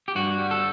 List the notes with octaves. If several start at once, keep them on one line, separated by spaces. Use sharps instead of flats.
G4
G2 F#4
G3
A4